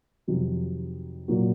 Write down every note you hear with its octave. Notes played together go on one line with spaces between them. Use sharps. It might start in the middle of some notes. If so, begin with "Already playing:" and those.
F2 C3 D#3 F#3
A#2 F#3 A#3 D#4 F#4